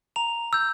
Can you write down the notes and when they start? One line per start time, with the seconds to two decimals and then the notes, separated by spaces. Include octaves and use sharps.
0.16 A#5 F7
0.53 E6 G6